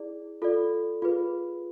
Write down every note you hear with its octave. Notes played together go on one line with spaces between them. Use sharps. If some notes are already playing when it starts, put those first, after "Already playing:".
Already playing: E4 G#4 D5
F4 A4 D5
F4 G#4 B4